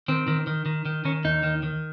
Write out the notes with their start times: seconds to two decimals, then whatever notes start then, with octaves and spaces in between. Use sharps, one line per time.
0.08 D#3 C4
0.28 D#3
0.47 D#3
0.66 D#3
0.85 D#3
1.05 D#3 C#4
1.24 D#2 D#4
1.43 D#3
1.63 D#3